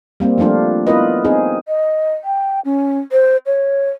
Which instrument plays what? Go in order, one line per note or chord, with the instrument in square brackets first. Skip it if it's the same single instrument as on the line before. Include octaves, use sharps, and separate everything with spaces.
[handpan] G3 A#3 C4
F3 G3 A3 D4 F4
B3 E4 F4 A#4 B4 D#5
C4 D#4 G#4
[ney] D#5
G5
C#4
C5
C#5